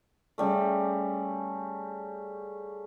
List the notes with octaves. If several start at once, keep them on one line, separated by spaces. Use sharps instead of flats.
C#3 G3 A3